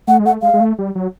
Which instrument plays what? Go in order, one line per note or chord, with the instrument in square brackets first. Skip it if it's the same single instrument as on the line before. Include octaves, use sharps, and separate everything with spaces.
[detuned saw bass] A3 [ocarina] F#5
[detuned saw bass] G#3
[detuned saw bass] A3 [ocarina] F#5
[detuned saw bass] G#3 [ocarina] F5
[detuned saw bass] G#3
A3
G3
F#3